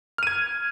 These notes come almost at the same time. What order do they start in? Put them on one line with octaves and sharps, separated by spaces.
F6 D#7 G#6